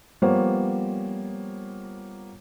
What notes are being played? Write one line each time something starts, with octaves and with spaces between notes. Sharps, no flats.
F3 G3 A#3 B3 C5 C#5